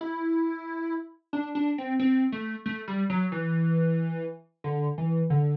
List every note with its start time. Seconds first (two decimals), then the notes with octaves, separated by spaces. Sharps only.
0.01 E4
1.33 D4
1.55 D4
1.78 C4
1.99 C4
2.32 A3
2.66 A3
2.88 G3
3.10 F#3
3.32 E3
4.64 D3
4.98 E3
5.30 D3